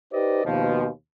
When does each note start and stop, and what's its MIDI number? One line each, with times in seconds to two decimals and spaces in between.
0.13 0.43 63
0.13 0.43 67
0.13 0.43 71
0.13 0.43 72
0.13 0.43 74
0.13 0.43 75
0.45 0.87 39
0.45 0.87 47
0.45 0.87 53